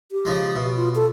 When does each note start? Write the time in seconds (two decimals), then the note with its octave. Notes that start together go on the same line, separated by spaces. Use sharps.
0.12 G4
0.25 C#3 F3 G#3
0.56 B2
0.76 F4
0.95 A4